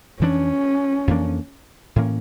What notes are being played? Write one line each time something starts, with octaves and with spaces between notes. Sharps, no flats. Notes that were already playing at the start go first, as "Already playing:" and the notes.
F2 E3 A#3 C#4 D4
F2 E3 A#3 D4
A2 E3 A#3 C#4